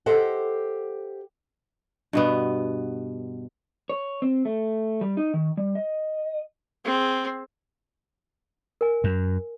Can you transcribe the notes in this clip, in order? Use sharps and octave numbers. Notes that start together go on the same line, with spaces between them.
G4 A4 C5 D#5 F#5
G2 B2 B3
C#5
C4
A3
G3
D#4
D#3
G3
D#5
C4 G#4
A#4 G#5
F#2